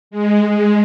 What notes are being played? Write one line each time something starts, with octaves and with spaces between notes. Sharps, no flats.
G#3
G#3